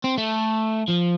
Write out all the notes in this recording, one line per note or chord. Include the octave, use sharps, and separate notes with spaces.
C4
A3
F3